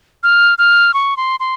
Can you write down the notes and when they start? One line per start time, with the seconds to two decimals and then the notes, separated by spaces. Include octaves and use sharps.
0.23 F6
0.58 F6
0.94 C#6
1.17 C6
1.40 C6